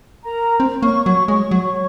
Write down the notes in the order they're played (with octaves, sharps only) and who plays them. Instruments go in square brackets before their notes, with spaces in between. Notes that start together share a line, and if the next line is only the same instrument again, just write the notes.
[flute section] A#4 A#5
[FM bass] C4
[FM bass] A#3 [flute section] C#5 C#6
[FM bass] F#3 [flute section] C#5 C#6
[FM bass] G#3 [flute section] C#5 C#6
[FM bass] F#3
[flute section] C#5 C#6